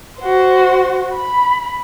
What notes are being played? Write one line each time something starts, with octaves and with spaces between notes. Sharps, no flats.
F#4 C5
B5